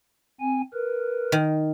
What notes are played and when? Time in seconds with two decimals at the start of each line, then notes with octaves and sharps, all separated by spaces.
0.40 C4 G#5
0.74 A#4 B4
1.32 D#3